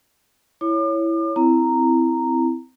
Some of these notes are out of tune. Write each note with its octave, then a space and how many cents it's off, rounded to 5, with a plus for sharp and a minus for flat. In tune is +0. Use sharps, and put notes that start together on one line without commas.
E4 +5 C#5 +0 D6 +40
C4 -20 E4 +0 A#5 -10